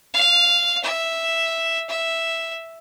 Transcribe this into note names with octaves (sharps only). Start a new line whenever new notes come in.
F5
E5
E5